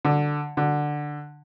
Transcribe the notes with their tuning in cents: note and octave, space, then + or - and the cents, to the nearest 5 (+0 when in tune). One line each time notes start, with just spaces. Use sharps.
D3 +5
D3 +10